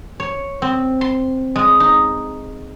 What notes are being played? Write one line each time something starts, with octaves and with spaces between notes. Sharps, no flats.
C#5
C4
C6
G#3
D#4